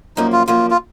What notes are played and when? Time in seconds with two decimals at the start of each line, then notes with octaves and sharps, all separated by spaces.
0.17 F#2 F3 A#3 D#4
0.32 F4
0.47 F#2 F3 A#3 F4
0.71 F4